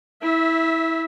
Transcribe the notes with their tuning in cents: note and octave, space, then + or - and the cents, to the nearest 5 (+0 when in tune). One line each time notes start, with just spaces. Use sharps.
E4 -20 E5 +0